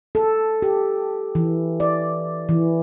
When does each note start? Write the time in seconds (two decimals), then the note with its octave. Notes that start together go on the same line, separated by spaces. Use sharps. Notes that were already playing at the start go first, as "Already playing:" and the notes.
0.15 A4
0.62 G4
1.35 E3
1.80 D5
2.49 E3